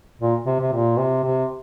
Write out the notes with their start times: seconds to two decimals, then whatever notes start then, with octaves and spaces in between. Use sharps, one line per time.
0.21 A#2
0.47 C3
0.60 C3
0.72 A#2
0.98 C3
1.24 C3